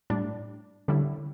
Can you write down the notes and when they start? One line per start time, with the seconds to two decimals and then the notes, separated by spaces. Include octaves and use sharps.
0.10 A2 G3 D4
0.88 D3 G3 C#4 E4